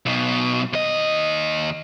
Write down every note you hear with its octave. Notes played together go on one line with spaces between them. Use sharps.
B1 B2
D#2 D#5